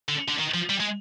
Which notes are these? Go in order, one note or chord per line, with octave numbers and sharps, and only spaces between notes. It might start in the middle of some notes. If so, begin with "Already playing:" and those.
D3
D3
D#3
F3
G3
G#3